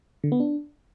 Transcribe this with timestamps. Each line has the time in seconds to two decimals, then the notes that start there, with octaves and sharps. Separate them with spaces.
0.24 D3
0.32 B3
0.40 D4